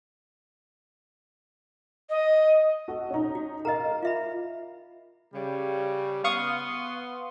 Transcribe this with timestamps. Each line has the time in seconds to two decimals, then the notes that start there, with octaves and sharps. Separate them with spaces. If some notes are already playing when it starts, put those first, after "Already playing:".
2.09 D#5
2.88 F#4 A4
3.10 C#4 D#4
3.35 F#4
3.65 A#4 D#5 F5 A#5
4.03 F4 E5 B5
5.34 C#3 G3
6.24 B3 F5 C6 C#6 D#6